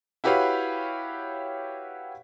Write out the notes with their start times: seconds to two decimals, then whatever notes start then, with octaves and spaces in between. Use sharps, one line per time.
0.24 E4 F#4 G4 B4 C#5 F5